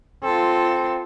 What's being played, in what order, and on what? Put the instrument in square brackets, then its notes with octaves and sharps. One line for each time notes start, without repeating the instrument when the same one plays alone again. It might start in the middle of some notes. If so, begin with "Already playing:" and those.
[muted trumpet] C4 [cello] F4 A4